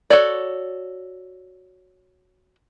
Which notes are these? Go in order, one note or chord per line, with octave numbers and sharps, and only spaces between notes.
F#4 A4 C#5 D5